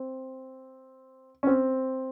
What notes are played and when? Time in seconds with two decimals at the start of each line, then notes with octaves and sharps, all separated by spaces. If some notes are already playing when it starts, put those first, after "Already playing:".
Already playing: C4
1.43 C#4
1.47 C4